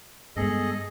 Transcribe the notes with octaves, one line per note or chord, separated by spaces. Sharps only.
G2 G#3 B3 G#4 A4 D#5